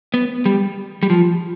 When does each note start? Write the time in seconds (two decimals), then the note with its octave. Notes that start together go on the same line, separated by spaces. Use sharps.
0.14 B3
0.45 G3
1.03 G3
1.10 F3